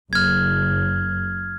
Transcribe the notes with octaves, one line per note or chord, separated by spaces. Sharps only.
F#1 F6 G#6